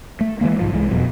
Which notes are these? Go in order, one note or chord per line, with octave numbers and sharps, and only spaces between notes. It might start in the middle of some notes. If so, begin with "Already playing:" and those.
A3
E3 G3 G#3 A#3
C2 G#2 F3
C2 E3 F3 G#3
E1 F2 B2 F#3